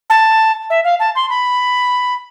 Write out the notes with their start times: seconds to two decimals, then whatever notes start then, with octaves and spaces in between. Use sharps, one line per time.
0.09 A5
0.70 E5
0.84 F5
0.99 A5
1.15 C6
1.29 B5